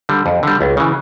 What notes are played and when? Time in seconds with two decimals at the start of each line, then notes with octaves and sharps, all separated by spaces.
0.09 D3 G3
0.26 F2
0.43 D3 G3
0.61 C#2
0.77 C#3 E3